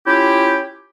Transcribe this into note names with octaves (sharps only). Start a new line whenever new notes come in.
C#4 E4 F4 G4